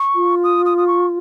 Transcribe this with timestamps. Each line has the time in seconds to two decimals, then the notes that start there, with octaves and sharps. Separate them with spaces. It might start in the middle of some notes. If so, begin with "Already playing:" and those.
Already playing: C#6
0.15 F4
0.44 D#6
0.65 D#6
0.78 D#6
0.87 C#6